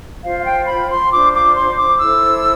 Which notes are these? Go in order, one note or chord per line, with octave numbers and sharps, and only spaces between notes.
F4 C5 F5
F5
G5
B5
C6
D4 F4 C5 D6
D6
C6
D6
E4 A4 C5 E6